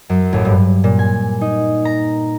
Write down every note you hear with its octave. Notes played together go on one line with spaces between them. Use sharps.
F#2
A1
G2
A#2
G#5
D#4
A#5